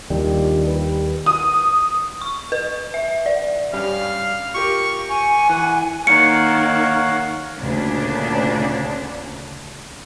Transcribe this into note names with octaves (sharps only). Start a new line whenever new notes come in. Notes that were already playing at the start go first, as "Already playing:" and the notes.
D#2 D#3 G3 D4 F4 G4
A#3 G4 B4
D#6
C#6
B4
E5
D5
G2 G3 C#4 F5
F4 G4 A#4 C#6
G#5 C#6
E3 F#5
D#3 A#3 C#5 F5 F#5 C#7
D2 A#2 C#3 D4